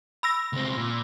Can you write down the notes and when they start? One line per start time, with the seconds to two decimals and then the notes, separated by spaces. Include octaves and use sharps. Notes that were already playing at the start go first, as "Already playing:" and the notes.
0.23 B5 E6 A#6
0.53 C#2 C4
0.77 A#2